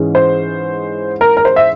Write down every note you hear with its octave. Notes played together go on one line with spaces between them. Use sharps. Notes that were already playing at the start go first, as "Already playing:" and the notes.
Already playing: G#2 E3 G#3 C#4
C5
A#4
A#4
C5
E5